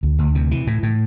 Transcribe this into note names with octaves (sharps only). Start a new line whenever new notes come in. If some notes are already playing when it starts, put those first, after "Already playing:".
D2
D2
C3
E3
A2
A2